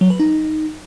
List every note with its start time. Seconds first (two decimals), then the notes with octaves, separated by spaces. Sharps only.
0.01 F#3
0.10 B4
0.20 D#4